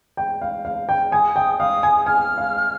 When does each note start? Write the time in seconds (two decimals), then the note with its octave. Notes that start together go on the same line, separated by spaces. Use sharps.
0.17 G5
0.42 F5
0.65 F5
0.89 G5
1.12 G#5 D#6
1.36 G5
1.59 F5 D#6
1.83 G#5
2.06 G#5 F6
2.38 F5